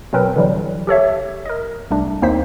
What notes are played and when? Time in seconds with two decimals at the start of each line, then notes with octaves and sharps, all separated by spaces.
0.13 B2 F#3 C4 A#4 B4
0.36 D3 E3 F#3 G3
0.87 G4 A4 C#5 E5
1.45 A#4 D#5
1.91 C2 A3 D4
2.22 D#2 A#3 C4 D#4 C5 B6